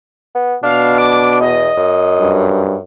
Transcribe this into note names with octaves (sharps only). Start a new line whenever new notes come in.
B3
B2 D4 F5
D6
E2 D#5
F#2
G2